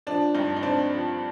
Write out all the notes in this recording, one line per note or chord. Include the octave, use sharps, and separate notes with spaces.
F3 D4
G2 D#4
D#4
C4 D4
F3